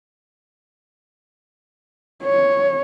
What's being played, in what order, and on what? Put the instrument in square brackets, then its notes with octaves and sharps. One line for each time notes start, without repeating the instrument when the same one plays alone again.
[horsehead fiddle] C#5